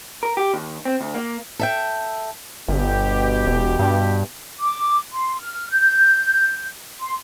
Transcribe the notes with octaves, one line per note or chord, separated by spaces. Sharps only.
A#4
G4
D#2
C4
D2
A#3
A4 E5 G5
G1 B2 G4
E1
G2
D6
C6
F6
G6
C6